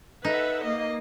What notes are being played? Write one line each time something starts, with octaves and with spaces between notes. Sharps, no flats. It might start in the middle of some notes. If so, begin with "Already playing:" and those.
D#4 A4 B4 E5 F#5
A#3 D#5